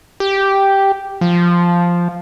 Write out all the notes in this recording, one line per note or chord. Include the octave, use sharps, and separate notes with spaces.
G4
F3